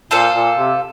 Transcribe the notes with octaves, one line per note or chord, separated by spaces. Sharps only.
A#2 F4 A4 C5 F5
A#2
C3